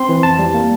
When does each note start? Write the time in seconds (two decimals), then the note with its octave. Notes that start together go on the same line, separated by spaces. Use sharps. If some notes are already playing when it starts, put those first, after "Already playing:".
Already playing: C4 C6
0.09 E3
0.23 F2 A5
0.39 G3
0.54 A#3